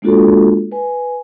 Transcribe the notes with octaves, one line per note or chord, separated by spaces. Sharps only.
G#3 A#3 D4 F4 F#4 A4
B4 G#5